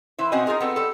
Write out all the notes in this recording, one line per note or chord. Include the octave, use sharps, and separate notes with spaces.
E3 E4 C5
B2 C4 C#4 F#4 D#5 G#5
D#4 F4 G#4 A#4 D#5
B3 C4 A4
G3 A4